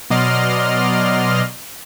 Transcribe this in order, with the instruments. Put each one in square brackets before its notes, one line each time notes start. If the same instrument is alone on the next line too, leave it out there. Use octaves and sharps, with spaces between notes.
[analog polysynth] B2 F#3 D5 D#5 C6 F6